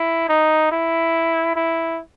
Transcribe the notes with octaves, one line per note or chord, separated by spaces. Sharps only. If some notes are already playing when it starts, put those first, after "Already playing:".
Already playing: E4
D#4
E4
E4